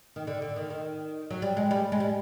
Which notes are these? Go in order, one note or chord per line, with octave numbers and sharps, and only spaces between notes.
D#3
D3
D3
D#3
D#3
F#3
G3
G#3
G3
G#3
G3